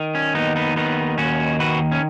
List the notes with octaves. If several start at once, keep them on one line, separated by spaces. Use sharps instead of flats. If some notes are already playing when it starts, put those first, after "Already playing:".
Already playing: D#3
C#4
D#2 B3 D#4
B3 D#4
D#3 B3 D#4
D#2 C#4 F#4
D#3 F#4 B4
C#4